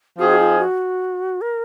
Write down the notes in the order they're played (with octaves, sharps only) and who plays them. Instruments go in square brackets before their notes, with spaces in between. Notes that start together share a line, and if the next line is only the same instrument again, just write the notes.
[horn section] F3 C4 D#4 G#4 [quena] F#4
[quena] F#4
F4
F#4
A#4